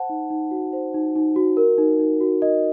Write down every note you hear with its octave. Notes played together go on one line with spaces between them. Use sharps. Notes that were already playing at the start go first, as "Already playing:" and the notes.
Already playing: C5 F#5 A5
D#4
D#4
F#4
C5
D#4
D#4
F#4
A#4
D#4
D#4
F#4
A#4 D#5